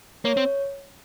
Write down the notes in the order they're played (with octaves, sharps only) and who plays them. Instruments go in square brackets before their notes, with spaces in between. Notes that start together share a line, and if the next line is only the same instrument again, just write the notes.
[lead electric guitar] A#3 [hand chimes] C#5
[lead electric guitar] C4